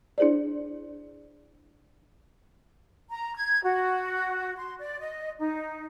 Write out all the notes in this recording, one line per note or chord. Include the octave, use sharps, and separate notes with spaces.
D4 E4 G#4 C5 D5
A#5
G#6
F#4
C6
D5
D#5
D#4